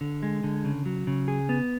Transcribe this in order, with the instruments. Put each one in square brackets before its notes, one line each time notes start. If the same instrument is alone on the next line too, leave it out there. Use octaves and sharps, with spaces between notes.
[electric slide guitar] D3
G#3
D3
C#3
F#3
C#3
G#4
B3